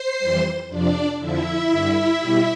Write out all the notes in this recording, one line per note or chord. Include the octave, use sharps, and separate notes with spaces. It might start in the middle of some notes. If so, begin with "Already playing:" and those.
Already playing: C5 C6
F2 E3 G3
F2 C3 F3 D4 D5
F2 D3 F3 E4 E5
G2 D3 G3
B2 G3